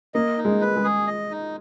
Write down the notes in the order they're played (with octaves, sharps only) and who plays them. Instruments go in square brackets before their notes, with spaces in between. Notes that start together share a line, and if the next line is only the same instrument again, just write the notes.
[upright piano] A#3 [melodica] D#5
[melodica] D#4
[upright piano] G#3
[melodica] B4
[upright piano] G#3
[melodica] G#4
D#5
D#4